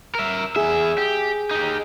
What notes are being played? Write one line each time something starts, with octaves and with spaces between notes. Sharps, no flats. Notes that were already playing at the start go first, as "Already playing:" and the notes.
A#4 E5
E2 G#4 E5
G4
D#4 G4